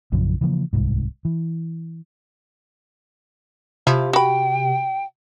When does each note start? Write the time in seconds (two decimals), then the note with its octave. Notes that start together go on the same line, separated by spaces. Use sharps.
0.12 A#1 F#2 C#3 F3
0.41 C#3 E3 F3 A#3
0.73 D1 C2 G#2
1.25 E3
3.87 C3 F3 E4 F4
4.13 F#4 G5 B5